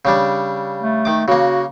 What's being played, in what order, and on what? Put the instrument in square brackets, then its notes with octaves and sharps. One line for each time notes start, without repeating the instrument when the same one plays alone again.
[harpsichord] C#3 G3 D4
[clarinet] A3
[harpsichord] D#3 D6
[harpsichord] C#3 A#3 [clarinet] F#4